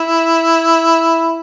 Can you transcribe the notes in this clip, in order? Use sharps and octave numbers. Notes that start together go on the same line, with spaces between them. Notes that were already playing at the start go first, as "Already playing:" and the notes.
Already playing: E4